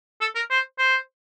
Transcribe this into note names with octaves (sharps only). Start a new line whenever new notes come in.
A4
A#4
C5
C5